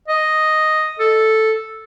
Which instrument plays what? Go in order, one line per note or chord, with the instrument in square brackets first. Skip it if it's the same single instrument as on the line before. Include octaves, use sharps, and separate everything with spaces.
[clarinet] D#5
A4